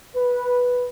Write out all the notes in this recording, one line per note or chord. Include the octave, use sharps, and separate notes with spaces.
B4